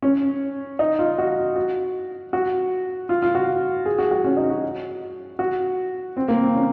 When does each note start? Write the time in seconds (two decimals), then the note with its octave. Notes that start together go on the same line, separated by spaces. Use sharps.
0.02 C#4
0.79 D#4
0.99 F4
1.18 F#4
1.56 F#4
2.33 F#4
3.09 F4
3.22 F4
3.35 F#4
3.86 G#4
3.98 F#4
4.11 F#4
4.24 C#4
4.37 D#4
4.50 F#4
5.39 F#4
6.17 C4
6.28 A#3
6.42 C4
6.54 C#4